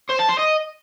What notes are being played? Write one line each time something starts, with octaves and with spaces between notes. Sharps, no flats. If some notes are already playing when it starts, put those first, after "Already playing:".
C5
A5
C5
D#5